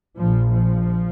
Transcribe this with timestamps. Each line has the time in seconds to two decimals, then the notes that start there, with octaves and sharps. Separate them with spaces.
0.17 A#1 A#2 F3
0.51 F3